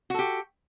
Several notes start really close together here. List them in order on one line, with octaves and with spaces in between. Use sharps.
F#4 A4 G4